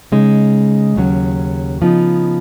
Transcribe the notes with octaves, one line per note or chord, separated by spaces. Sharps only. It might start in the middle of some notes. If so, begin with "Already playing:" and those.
C#3 G#3 D#4
D#2 C#3 F#3 C#4
C#3 F3 B3 D#4